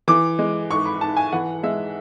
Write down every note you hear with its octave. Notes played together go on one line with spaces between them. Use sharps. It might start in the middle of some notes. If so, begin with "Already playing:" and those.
E3 D6
G#3
G#2 C#6
B5
G#2 A5
G#5
E3 F#5
G#3 E5